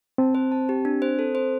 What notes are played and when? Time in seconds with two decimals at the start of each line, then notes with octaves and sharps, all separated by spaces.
0.18 C4 A5
0.35 C5
0.52 A5
0.69 G4
0.85 D4
1.02 C5
1.19 A4
1.35 C5